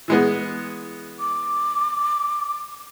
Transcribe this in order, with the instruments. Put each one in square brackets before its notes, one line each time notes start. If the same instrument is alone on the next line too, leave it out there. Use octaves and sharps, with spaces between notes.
[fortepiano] E3 G#3 B3
[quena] D6